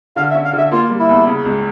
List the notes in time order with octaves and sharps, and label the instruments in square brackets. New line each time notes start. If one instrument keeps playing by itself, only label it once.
[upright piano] D3 [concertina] F5
[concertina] E5
[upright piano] C#4
[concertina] F5
[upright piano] D3 [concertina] E5
[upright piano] A#3 [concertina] F4
[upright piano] G3
[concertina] E4
[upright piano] E2
C#3
C#2